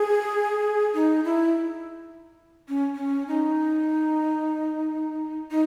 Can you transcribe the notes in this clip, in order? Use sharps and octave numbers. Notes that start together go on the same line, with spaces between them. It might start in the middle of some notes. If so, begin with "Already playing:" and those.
Already playing: G#4
D#4
E4
C#4
C#4
D#4
D#4